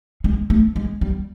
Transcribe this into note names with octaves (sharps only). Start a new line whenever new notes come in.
G#3
A3
G#3
G3